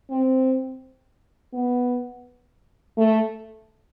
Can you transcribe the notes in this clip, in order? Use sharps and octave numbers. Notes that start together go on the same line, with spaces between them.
C4
B3
A3